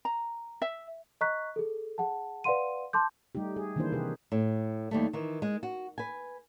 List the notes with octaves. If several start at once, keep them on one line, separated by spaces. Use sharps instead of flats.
A#5
E5
D#5 A#5 C#6 F#6 B6
G#4 A4
G#4 F#5 A5
B4 D5 F5 F#5 C6 D#7
A5 C6 D6 G6
G3 A3 D#4 G4
G#4
D#3 E3 A#3 D4 E4 C5
C3 G4 G#4 B4
A2
D#2 G3 A3
D#3 E3
G#3
F#4
B4 G#5